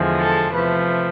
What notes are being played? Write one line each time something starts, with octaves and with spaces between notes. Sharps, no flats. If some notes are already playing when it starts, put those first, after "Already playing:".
Already playing: E2 D3 F3 G#3
A4
C3 F3 A3 B4